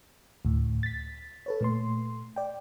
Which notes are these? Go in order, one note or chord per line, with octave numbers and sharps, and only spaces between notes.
D2 A2
A6 B6
A4 B4 C#5
A#2 A3 C6
D5 G5